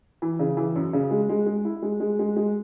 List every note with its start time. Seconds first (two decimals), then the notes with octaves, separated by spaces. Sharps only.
0.22 E3
0.39 C#3
0.57 E3
0.75 F#2
0.93 C#3
1.11 G#3
1.29 G#3
1.46 G#3
1.65 E4
1.82 G#3
2.00 G#3
2.19 G#3
2.36 G#3